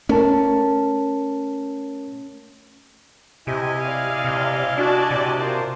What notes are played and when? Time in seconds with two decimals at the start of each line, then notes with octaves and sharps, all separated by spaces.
0.09 A3 C#4 A#4 A5
3.47 C3 E4 G4 D#5 G#5
3.79 D5 F5
4.25 C3
4.78 D4 F#4 D5 A5
5.11 C3
5.40 F4 A#4 C5